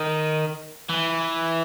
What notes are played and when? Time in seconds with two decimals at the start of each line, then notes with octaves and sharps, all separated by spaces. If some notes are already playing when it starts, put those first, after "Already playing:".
Already playing: D#3
0.89 E3